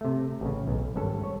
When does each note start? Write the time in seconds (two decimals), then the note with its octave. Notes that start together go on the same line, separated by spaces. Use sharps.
0.01 C3 A3
0.41 A1 C#3
0.67 B1
0.96 G#1 G2 C#4 A4
1.24 C#5